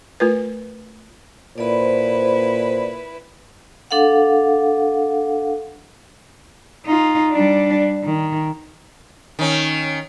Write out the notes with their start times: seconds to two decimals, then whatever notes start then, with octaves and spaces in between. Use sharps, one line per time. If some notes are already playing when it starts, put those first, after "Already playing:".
0.20 A3 F4 A#4 B4
1.58 A#2 E4 B4 C5 D5 B5
3.91 D4 A4 F5 F#5
6.86 D#4 F4
7.32 G3 D4
8.04 D#3
9.39 D#3 C#4